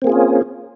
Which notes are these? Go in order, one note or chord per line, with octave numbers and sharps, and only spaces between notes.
A#3 C4 C#4 F4 G#4